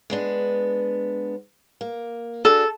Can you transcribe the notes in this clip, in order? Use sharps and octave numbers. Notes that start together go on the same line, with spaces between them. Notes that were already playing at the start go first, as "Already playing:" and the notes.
G#3 B3 D4
A#3
D4 F#4 G#4 A4